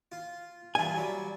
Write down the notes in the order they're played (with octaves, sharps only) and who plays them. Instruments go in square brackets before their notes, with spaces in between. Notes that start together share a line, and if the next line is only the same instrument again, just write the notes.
[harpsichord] F4
[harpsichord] G2 E3 F4 [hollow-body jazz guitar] G#5
[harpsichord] F#3 G3